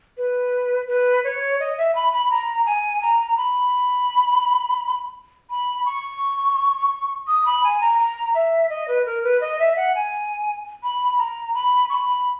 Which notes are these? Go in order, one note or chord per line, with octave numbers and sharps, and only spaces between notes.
B4
B4
C#5
D#5
E5
B5
B5
A#5
G#5
A#5
B5
B5
C#6
D#6
B5
G#5
A#5
A#5
E5
D#5
B4
A#4
B4
D#5
E5
F#5
G#5
B5
A#5
B5
C#6
B5